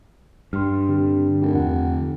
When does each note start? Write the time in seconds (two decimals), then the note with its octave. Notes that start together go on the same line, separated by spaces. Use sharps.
0.53 G2 C6 F6
0.89 D3 C4 G4
1.42 F1 G4 A#4
1.54 E2 D3 F#5